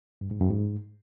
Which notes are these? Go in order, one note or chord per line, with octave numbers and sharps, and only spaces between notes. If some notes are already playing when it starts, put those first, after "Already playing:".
G2
G#2
F#2
G#2